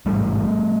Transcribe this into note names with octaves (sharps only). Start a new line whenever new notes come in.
A1 G#2 G3 A3